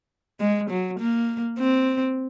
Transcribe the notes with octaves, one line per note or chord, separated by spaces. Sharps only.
G#3
F#3
A#3
C4